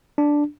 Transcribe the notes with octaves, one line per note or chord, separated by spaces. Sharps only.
D4